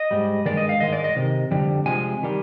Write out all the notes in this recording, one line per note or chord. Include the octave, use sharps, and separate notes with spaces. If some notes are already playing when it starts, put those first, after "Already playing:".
Already playing: D#5
G#2 G3
G2 D#3 G#3 D5
D#5
F5
G#2 D#3 G#3 D#5
D5
D#5
C3 D#3
F2 D3 G3
C3 F3 G#3 G#5
D#3 G3